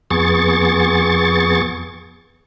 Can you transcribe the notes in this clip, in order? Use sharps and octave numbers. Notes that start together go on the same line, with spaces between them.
F2 B3 G#4 C#6 A6